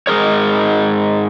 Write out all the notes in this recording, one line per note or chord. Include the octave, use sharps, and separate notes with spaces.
G#2 D#4 G#4 A#4 C#5